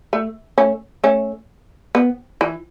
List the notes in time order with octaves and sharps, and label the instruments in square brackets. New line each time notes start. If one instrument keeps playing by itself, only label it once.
[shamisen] A3
A3 C#4
A3 C#4
B3
E3